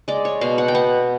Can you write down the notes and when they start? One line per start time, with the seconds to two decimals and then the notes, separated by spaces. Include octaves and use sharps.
0.08 G#3 D5
0.25 C#5
0.41 B2 F5
0.58 F#5
0.68 G5
0.75 B3 F#5